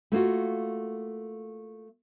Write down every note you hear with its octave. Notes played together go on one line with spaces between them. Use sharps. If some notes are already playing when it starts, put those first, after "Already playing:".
A3 A#3 F4 F#4